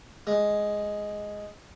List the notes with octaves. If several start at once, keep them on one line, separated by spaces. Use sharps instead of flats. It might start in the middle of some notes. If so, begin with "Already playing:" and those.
G#3